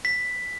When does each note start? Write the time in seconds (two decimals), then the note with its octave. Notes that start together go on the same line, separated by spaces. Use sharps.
0.05 B6